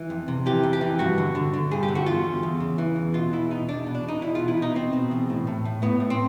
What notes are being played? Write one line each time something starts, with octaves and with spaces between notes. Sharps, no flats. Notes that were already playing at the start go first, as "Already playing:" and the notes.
Already playing: E3
F2
C3
E3 G4
F2
G4
E3
G2 F#4
D3
D3
D3
G2 G#4
G4
D3
F#4
E2 F4
E2
E2
C#3
E3
E2
B2 F4
E2 E4
B2 D#4
E2 D4
B2
D4
B2
D#4
E2 E4
B2 F4
E4
B2 D#4
B2 C4
B2
E2
A2
A2
A2
A2 B3
A2
C4